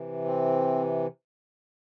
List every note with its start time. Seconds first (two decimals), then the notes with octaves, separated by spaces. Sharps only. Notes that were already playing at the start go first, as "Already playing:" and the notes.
Already playing: C3 E3
0.24 C4